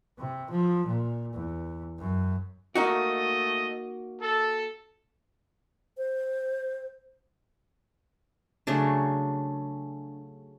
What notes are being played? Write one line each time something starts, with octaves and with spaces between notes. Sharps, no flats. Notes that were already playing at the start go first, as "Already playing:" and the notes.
C3
F3
A#2
E2
F#2
A3 A#3 D#4 F#4 D#5
A4
C5
C#3 F#3 A3 D4